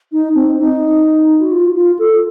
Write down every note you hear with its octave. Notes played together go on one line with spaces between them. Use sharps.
D#4
C4
D#4
F#4
F4
F4
A4